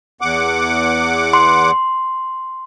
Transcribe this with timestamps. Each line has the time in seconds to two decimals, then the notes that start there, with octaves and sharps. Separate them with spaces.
0.21 E2 F#5 D6
1.33 C6